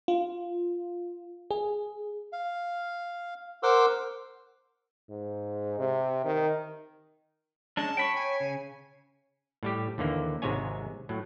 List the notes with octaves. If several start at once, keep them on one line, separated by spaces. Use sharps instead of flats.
F4
G#4
F5
A#4 C5 F#5 C6 D6 E6
G#2
C3
D#3
G#3 C#4 D4 A5
C#5 G5 B5 C#6
G#5
C#3
A2 G3 G4
D#2 D3 E3 A#3
G#1 G#2 C3 G#3 C#5 G#5
A2 F#3